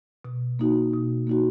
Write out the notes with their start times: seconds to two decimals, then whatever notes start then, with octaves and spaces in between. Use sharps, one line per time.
0.25 B2
0.59 A#3 D#4 F#4
0.93 B2
1.27 A#3 D#4 F#4